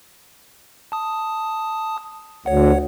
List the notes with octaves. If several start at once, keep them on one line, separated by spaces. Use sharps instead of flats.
A5 D#6
D2 C#5 F#5